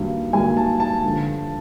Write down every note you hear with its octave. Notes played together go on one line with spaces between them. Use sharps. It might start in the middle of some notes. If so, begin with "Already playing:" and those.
Already playing: G2 D#3 F#3 A#3
G2 D#3 F#3 A#3 G#5
A5
A5
G2 D3 F3